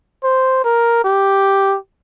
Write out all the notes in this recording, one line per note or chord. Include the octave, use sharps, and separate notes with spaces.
C5
A#4
G4